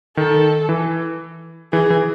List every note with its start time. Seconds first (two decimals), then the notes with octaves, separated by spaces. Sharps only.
0.17 D#3 A4
0.69 E3
1.72 E3 G#4
1.90 E3